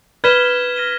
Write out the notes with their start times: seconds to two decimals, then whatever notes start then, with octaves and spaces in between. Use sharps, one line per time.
0.24 B4 F6 G#6 B6 E7 G7
0.76 F6 A#6 D#7 G7